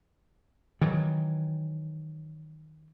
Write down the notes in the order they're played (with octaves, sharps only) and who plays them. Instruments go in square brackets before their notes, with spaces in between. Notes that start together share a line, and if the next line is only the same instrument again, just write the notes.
[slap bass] D#3 E3 F#3